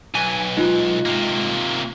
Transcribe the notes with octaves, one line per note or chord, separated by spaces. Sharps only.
B1 G#5
G#3 D#4 F4
C3 A#3